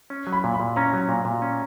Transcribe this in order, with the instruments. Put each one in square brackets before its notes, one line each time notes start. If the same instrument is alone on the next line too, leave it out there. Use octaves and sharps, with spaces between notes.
[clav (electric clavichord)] C#4
F#3
[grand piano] B5
[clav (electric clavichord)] A#2
[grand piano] B5
[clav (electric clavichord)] A#2
[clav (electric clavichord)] C#4 [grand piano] A#5
[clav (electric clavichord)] F#3
A#2
A#2
C#4